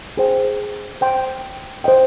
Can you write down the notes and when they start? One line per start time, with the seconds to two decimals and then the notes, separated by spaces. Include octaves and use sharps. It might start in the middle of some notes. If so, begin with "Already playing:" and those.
0.17 G#4 C5 G5
1.01 C5 G5 C6
1.84 C5 D#5 G5